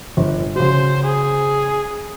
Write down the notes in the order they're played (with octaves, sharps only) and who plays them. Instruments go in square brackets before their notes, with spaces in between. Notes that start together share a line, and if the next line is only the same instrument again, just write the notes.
[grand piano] G1
[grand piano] C#3 F#4 [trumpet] C5
[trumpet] G#4